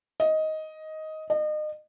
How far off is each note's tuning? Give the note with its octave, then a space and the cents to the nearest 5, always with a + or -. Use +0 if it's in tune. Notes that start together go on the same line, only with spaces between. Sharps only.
D#5 +10
D#5 -35